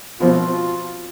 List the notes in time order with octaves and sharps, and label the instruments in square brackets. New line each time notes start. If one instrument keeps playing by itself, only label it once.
[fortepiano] B2 F3 C4 [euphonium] F4